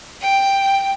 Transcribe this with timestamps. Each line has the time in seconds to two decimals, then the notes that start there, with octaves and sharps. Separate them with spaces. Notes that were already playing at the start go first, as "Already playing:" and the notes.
0.21 G5